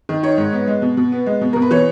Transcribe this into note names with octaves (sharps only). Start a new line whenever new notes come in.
D#3
D#4 C#5
G#2
B3
G#3
B2
B2
B3
G#3
B2
B2 A#4
B4
E3 C#5